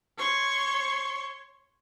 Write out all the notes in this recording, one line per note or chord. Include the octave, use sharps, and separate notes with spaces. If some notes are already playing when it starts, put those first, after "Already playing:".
C#5 C6 C#6